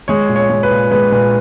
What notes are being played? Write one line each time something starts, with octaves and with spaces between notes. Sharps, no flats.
G#3 C#5
A#2
C#5
G#3
B4
A#2
G#3 B4
A#2 B4